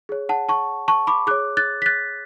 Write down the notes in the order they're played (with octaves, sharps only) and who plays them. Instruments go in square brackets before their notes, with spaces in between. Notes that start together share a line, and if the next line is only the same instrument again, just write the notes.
[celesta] G#4 C#5
F#5 A5
A5 C#6
A5 C#6
B5 D6
G#4 C#5 D6 F#6
F#6 A6
B6
F#6 A6